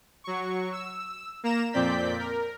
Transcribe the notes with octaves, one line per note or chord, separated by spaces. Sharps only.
F#3 C#6
E6
A#3 A#5 E7
F2 A#2 C4 D5 G6 B6
A#4